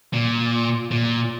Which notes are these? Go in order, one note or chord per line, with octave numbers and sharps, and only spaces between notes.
A#2
A#2